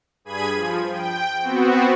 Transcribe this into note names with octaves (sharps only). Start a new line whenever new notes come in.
G2 G#4 B5 G#6 D#7
F3
G5
B3 C4 F#4